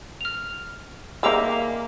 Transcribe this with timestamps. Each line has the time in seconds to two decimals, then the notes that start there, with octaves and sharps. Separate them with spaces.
0.21 F6 F7
1.23 G3 A#3 D#4 G#4 E5 A#5 D6 E6